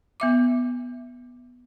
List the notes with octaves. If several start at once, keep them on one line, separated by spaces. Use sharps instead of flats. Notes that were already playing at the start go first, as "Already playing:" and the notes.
B3 E5 D6